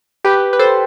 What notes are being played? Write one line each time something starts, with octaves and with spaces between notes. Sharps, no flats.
G4 B4
B4
A4 C5